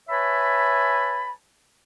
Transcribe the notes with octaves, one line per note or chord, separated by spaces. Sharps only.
B4 C#5 E5 G#5 A5 B5